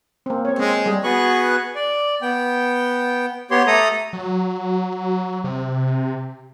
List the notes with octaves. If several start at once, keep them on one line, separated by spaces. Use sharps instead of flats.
A#3 C4
C4 C#5
G#3 C4
G3 G#4
B3 F#4 G#4 B4 C#6 F#6
D5
B3 G5
B3 G4 C#5 C6
A3 A4 A#5 D#6
F#3
C3